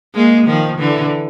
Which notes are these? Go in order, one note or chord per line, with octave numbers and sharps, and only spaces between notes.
G#3 A#3
D#3 F3
D3 E3